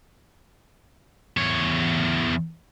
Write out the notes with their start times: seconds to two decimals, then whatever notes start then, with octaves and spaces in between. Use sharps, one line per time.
1.37 E2 C#5